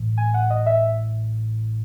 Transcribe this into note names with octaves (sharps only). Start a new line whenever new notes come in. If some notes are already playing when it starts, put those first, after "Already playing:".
Already playing: A1 A2 E3
G#5
F#5
D#5
E5